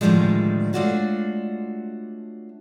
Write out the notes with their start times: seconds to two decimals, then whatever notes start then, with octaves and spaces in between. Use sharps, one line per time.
0.01 A2 D3 D#3 F3 G3 G#3
0.73 G#3 A3 D4 F4 F#4 C#5